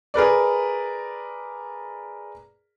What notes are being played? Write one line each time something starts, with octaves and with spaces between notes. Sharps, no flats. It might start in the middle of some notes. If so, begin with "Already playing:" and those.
G#4 A#4 B4 D5